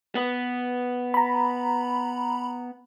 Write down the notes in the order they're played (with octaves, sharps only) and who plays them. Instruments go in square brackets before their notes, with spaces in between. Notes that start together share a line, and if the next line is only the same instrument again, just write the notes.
[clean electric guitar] B3 B4
[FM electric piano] A#5 B5